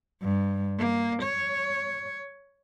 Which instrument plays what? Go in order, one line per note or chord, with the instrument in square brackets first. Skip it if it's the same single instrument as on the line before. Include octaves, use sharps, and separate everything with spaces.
[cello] G2
A#3
C#5